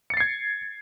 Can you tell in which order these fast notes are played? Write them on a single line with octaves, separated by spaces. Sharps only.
C#7 A6 C7 G#6